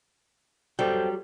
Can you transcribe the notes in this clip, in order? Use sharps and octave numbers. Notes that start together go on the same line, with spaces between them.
F#3 G3 A4 C5 G5